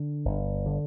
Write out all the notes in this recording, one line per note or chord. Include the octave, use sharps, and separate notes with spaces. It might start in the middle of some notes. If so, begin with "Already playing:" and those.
Already playing: D3
G1
D3